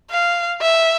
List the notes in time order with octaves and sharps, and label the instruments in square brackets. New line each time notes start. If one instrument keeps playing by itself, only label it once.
[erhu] F5
E5